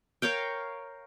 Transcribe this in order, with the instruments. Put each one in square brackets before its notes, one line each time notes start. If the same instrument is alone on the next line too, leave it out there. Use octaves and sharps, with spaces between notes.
[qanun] A#4 C#5 F5 G5